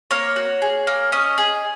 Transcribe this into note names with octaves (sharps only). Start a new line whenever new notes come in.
A#3 C#5
F#4
G#4
A#3
C#4 D#5
G#4